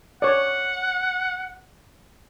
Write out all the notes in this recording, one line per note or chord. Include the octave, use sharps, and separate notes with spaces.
C#5 D5 F#5